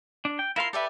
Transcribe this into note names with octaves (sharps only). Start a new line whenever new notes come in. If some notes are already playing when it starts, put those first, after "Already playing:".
D4
G5
E4 F4 A#4 F5 C6
G4 A4 B4 D5 E5